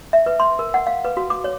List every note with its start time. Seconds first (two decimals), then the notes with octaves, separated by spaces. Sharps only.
0.13 E5
0.26 B4
0.40 C6
0.59 A#4
0.74 F#5
0.87 F5
1.05 B4
1.17 F#4
1.30 D6
1.44 C#5